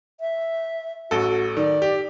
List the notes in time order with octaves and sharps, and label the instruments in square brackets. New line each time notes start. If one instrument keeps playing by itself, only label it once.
[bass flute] E5
[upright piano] A1 A4 [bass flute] F#4
[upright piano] D#3 [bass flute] D5
[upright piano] G4